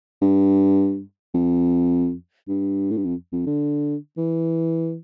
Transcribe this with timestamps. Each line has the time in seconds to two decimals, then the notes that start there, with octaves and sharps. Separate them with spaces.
0.22 G2
1.34 F2
2.48 G2
2.91 A2
2.97 G2
3.05 F2
3.32 F2
3.46 D3
4.17 E3